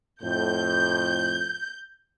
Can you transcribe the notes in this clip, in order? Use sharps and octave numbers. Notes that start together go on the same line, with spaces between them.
F2 A2 G6